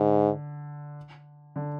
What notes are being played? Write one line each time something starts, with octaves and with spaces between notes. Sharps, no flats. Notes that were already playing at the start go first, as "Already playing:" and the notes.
Already playing: G#2 D3
D3